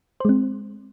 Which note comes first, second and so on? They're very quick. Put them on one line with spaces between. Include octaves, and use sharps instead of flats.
C5 G#3 C4